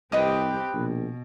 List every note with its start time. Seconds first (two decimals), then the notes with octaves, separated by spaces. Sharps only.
0.12 C2 C4 G4 B4 D#5 D#6
0.74 A#1 B2